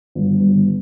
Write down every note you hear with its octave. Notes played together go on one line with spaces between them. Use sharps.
G1
G1